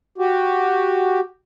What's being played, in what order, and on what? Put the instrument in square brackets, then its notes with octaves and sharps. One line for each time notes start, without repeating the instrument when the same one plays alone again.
[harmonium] F#4 G4